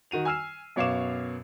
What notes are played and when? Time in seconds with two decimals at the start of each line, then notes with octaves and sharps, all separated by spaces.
0.11 D#3 F#4 D#7 F7
0.25 G#5 E6 F6 C7 E7
0.76 F#2 B2 C#5 F5 D6 E7